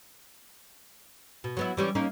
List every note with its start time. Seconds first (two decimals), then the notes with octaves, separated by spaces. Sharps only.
1.44 B2
1.57 F#3 B3 E4
1.77 E3 G3 C#4
1.95 A#3 C#4 D#4